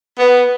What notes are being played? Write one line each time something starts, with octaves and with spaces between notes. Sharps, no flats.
B3